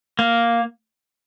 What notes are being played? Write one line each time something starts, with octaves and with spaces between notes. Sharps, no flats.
A#3